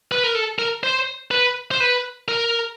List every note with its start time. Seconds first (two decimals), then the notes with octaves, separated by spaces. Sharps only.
0.12 B4
0.23 A#4
0.35 A4
0.59 A#4
0.83 C5
1.31 B4
1.71 C5
1.80 B4
2.29 A#4